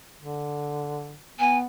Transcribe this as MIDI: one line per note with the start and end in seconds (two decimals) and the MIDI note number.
0.20 1.18 50
1.40 1.66 59
1.40 1.58 80